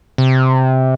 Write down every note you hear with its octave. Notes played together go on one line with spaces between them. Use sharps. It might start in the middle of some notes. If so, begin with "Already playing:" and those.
C3